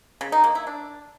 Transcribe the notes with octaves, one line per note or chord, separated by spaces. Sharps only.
C#3
D#4
A#3
E4
D4